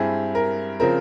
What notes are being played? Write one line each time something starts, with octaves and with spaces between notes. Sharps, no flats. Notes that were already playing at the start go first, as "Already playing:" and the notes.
Already playing: G2 G3 C4 E4 G#4
A#4
C#3 F3 C4 A#4